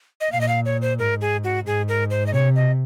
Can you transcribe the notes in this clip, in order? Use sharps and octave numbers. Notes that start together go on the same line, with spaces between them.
D#5
A#2 F5
D#5
F5
C#5
C5
G#2 A#4
G#4
F#4
G#2 G#4
A#4
C5
D#5
C3 C#5
D#5